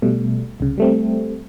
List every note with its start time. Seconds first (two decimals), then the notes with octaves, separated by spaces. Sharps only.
0.02 B2 G3 A3
0.60 C2 C#3
0.78 G3 A3 C4